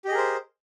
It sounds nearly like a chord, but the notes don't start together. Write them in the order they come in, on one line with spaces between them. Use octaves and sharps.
G4 D#5 G#4 A#4 C5